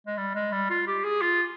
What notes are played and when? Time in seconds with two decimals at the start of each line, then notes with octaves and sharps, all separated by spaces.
0.07 G#3
0.17 G3
0.35 G#3
0.52 G3
0.70 F4
0.87 G4
1.04 G#4
1.22 F4